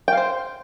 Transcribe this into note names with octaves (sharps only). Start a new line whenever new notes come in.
C5 F5 G5